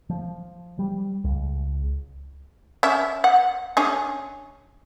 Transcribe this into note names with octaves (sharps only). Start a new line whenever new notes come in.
F3
G3
C#2
C#4 E5
F#5
C#4 D4 G#4